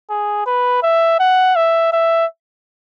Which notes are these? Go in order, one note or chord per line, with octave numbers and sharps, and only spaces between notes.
G#4
B4
E5
F#5
E5
E5